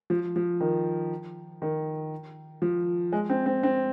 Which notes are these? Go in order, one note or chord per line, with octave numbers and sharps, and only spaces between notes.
F3
F3
D#3
D#3
F3
G#3
C4
C4
C4